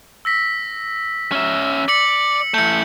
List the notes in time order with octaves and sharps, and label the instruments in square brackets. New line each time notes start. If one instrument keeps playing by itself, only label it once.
[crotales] E6 A#6 B6
[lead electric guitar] C#4 E5
[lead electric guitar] D5 [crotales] B6 C#7 F#7
[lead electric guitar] E3 A3 [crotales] G6 C#7